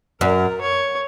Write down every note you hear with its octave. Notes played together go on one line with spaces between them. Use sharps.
F#2 A#4
C#5